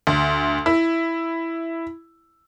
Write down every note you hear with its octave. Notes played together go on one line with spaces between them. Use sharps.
D2
E4